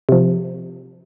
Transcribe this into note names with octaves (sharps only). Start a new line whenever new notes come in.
C3 F3